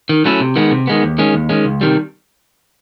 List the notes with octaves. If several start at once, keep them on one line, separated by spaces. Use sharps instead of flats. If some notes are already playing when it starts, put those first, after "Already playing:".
D#3
F#3 A3 C#4 E4
C3
D#3 G#3 B3
C3
D#3 G#3 B3
D#2
D#3 G#3 C#4
D#2
D#3 G#3 C#4
C#2
C3 D#3 G3